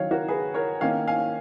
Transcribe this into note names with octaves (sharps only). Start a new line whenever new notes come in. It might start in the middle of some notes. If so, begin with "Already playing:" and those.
Already playing: D#3 F#3 C#4 C#5 F5
F#4 A#4
G#4 B4
A#4 C#5
D#3 A#3 C#4 C#5 F5
F5 G#5